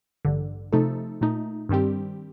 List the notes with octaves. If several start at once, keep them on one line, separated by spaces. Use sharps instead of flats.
A1 G2 D3
C3 F3 A3 D#4 A4
A#2 A3 D#4
G2 D#3 G3 C4 G4